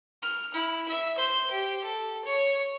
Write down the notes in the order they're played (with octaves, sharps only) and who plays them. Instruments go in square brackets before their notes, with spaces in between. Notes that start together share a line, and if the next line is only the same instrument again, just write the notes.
[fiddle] F6
E4
E5
C5
G4
A4
C#5